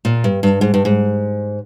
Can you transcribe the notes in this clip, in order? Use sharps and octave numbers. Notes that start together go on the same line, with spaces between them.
A#2
G2
G2
G#2
G2
G#2